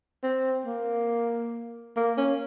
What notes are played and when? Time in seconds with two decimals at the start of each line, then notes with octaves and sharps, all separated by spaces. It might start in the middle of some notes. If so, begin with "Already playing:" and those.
0.23 C4
0.66 A#3
1.96 A#3
2.17 C#4